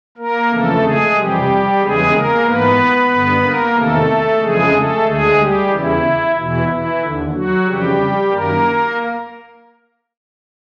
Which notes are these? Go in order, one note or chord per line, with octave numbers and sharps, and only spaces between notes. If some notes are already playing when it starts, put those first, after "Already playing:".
A#3 A#4
F2 C#3 E3 A3 A4
G#3 G#4
F2 C3 E3 G3 G4
E2 C#3 E3 G#3 G#4
A#3 A#4
G#2 E3 B3 B4
G2 D3
A#3 A#4
E2 C3 D#3 A3 A4
F2 C#3 E3 G#3 G#4
A3 A4
D2 D3 G#3 G#4
G3 G4
E2 C#3 E3 E4
E2 B2 E3 E4
E3 E4
D#2 D3
F#3 F#4
F2 C#3 E3 G3 G4
F#2 D#3 A#3 A#4